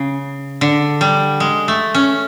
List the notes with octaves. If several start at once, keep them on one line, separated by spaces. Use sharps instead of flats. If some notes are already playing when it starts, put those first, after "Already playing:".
Already playing: C#3
D3
G3
G#3
A3
C#4